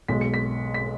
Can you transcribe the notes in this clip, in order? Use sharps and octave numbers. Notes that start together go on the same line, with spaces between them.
B1 B2 G#3 B6
C#7
B6
B6